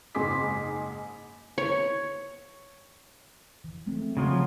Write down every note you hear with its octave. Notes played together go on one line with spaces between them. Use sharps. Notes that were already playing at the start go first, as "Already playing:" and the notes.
F#1 G#2 G#4 C6 D6 B6
C#5
E3
G#3 A3 C4
C#3 F3 F#3